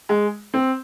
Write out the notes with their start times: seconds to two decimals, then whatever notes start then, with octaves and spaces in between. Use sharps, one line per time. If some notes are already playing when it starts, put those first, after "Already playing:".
0.09 G#3
0.54 C4